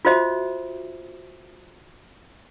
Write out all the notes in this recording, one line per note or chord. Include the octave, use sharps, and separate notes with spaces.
F4 F#4 C5 D#5 E5